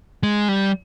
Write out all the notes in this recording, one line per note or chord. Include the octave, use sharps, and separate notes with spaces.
G#3
G3